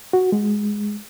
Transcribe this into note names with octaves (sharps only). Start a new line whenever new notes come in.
F#4
G#3